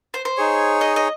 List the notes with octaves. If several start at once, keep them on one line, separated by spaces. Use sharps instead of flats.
C5
C5
D#4 G#4 C#5
D#5
D#5